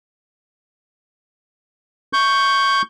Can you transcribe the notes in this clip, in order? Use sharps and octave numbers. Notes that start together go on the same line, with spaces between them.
C#6 G6